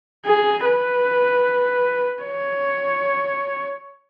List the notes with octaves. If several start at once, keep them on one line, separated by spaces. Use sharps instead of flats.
G#4
B4
C#5